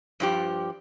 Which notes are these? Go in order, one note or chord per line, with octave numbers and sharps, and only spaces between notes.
G2 F3 G4